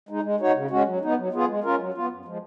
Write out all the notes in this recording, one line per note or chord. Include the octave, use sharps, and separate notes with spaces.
G#3 D#4
G#3
D#4 F#4 C#5
C#3
G#3 C#4 F#4
F#3
B3 D#4
F#3
B3 F4 G#4
G#3
C#4 F4 A#4
F#3
B3 F4
F#2
F3 G#3